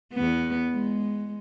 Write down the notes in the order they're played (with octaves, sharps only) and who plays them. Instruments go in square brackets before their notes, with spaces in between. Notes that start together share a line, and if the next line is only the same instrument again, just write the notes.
[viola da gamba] E2 B3
G#3